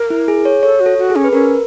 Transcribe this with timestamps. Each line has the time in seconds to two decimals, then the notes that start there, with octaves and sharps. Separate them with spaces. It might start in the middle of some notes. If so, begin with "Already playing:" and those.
Already playing: A#4
0.10 E4
0.28 G#4
0.45 C#5
0.63 A4 C#5
0.80 F#4
0.86 A4
0.98 F#4
1.10 G#4
1.16 C#4
1.24 B4
1.33 C#4 A#4